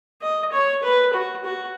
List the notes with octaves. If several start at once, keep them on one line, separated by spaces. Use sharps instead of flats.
D#5
C#5
B4
F#4
F#4